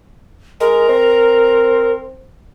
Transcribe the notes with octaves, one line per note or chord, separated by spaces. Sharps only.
G#3 A#4
C4